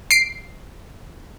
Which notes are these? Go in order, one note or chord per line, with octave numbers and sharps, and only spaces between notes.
C7 D7